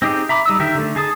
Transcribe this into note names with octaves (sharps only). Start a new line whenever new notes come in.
C4 D#4 G4 G#4
E5 A#5 B5 D6
G3 D#4 E6
D3 D#3 G4 A#4 E5
D3 A3
D#4 G#4 A5 D#6